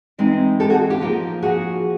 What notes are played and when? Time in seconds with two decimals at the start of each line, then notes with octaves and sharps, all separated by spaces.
0.18 E3 G#3 C4 D#4
0.60 G4 A4
0.70 F#4 G#4
0.90 F4 G4
1.01 F3 A#3 D#4
1.42 F#4 G#4